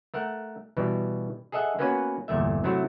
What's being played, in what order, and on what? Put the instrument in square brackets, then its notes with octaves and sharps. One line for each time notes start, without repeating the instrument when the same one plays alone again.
[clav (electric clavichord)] A3 A#4 F#5
B2 E3 G3
G#4 A4 D#5 E5 F#5
A#3 B3 C#4 F#4 B4 G#5
G1 E2 A#2 A3 E5
C3 F#3 A3 E4 F#4